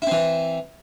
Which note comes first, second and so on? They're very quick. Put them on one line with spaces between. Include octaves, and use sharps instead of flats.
E4 C4 E3